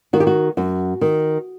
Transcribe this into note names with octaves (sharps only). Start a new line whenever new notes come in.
D#3 F#4
G4
F#4
F#2 F#4
D#3